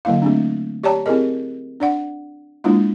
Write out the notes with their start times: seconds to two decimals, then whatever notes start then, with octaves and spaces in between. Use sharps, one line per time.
0.05 D3 F#3 A#3 E4 F5
0.22 A3 C4 D4
0.84 G4 C#5 D5 G5 A5 A#5
1.06 C4 E4 G4 G#4 A#4 D#5
1.80 D4 D5 F#5
2.64 G#3 A#3 D4 E4 F4